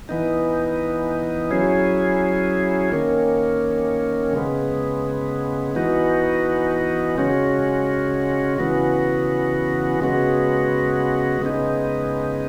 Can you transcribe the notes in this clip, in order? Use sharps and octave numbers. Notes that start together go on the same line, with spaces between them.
E3 B3 D#4
F#3 C#4 E4 G#4
D#3 A#3 C#4
C#3 G#3 B3
E3 B3 D#4 F#4
C#3 G#3 C#4 F#4
C#3 E3 B3 F#4
C#3 G#3 B3 F#4
C#3 G#3 B3 D#4